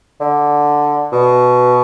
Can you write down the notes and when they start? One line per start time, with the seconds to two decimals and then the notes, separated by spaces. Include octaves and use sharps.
0.21 D3
1.12 B2